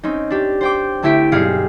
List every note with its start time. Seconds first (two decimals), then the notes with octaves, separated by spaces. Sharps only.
0.03 C4 C#4 D#4
0.30 D4 G4
0.61 C5 G5 D6
1.03 D2 A3 E4 G4 B6 D7
1.32 B1 G2 G4 G#4 F5 C#7